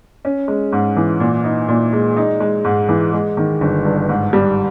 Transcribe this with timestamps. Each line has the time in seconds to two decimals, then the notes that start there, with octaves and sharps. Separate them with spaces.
0.25 C#4
0.48 G#3
0.72 G#2
0.97 E3
1.20 A#2
1.44 D#4
1.68 A#2
1.93 G#3
2.17 D#4
2.40 G#3
2.65 G#2
2.89 E3
3.13 G#3
3.37 D#3
3.61 G1
3.85 G2
4.09 G#2
4.33 G3